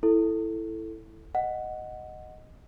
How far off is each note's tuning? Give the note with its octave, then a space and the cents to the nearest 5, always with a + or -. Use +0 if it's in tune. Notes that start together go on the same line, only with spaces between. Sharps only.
E4 +0 A4 +0
D#5 +0 F#5 +0